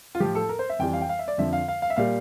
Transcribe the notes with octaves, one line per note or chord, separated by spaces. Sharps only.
F4
A2 F3 G4
A4
A#4
C5
E5
F2 E3 G3 G5
F5
G5
F5
E5
D5
F2 D3 F3 E5
F5
F5
F5
E5
A#2 G3 F5